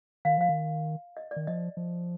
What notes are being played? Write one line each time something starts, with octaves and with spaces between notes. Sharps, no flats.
D#3 F5
F3 F5
D#3
D#5
D5
D#3
F3 D#5
F3